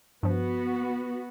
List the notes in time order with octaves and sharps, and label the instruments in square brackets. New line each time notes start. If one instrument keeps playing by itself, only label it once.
[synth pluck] G2 F3 [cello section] B3 F#4